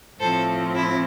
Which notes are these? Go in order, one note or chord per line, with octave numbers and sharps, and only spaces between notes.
A2 F3 C4 A4 C5
E4